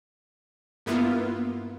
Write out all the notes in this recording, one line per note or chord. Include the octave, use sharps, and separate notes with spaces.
G2 A#3 B3 E4 F4